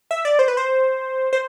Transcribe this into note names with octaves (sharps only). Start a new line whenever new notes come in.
E5
D5
C5
B4
C5
C5